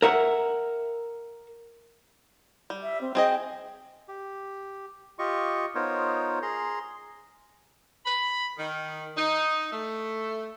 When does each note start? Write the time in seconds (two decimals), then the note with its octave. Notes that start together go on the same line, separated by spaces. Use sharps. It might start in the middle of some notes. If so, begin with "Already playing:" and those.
0.02 A#4 E5 F#5
2.70 G3
2.83 E5
3.01 C4
3.15 C4 G#4 D#5 G5
4.08 G4
5.19 F4 G4 D#5 C#6
5.75 B3 D#4 F4 A#4 C5 C#5
6.42 G#4 A#5 C6
8.05 B5
8.58 D#3
9.16 D#4
9.72 A3